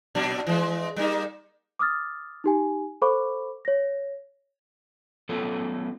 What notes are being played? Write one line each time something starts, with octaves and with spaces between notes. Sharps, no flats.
A#2 F#3 D4
E3 G#3
G3 A#3 D#4
D6 D#6 F6 A6
D#4 G4 G#5
A4 C5 F5 B5 C#6 D6
C#5 A#6
F#3 A3 B3 C#4 F4 A4